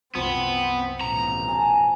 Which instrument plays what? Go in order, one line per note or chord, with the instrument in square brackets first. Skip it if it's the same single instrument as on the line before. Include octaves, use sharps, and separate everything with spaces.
[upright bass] C2 F#2 [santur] F3 [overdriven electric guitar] B3 [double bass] C4
[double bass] A1 B2 [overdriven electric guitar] A#5
[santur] G#5 A5